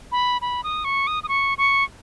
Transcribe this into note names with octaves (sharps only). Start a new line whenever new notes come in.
B5
B5
D#6
C#6
D#6
D#6
C#6
C#6